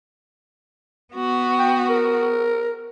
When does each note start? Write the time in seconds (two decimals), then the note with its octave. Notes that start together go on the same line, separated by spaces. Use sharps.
1.13 B3 F#4
1.59 G5
1.90 A#4